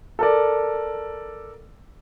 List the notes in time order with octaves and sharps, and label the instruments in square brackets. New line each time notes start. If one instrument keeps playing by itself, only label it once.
[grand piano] A4 A#4 D5